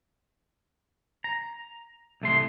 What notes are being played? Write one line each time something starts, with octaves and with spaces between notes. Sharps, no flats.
A#5
C2 A3 C6